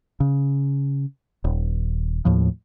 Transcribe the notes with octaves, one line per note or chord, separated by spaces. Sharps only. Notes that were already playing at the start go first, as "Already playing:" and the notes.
C#3
D#1
D#2 A2 F3